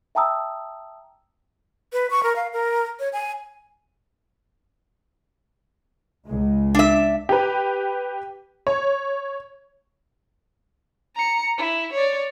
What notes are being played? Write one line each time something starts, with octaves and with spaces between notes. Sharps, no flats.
E5 G5 A5 A#5 D#6 E6
B4
C#6
A#4
F5
A#4
C#5
G#5
C#2 G#3
D4 E5
G4 B4
C#5
A#5 C#7
E4
C#5 D5